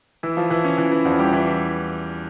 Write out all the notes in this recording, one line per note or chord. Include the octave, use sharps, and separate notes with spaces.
E3 E4
F3 F4
E3 E4
C#4
E3 E4
E3 E4
E2 F3 F4
G3 G4
E3